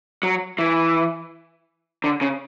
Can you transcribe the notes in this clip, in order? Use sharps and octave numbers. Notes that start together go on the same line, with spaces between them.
F#3
E3
D3
C#3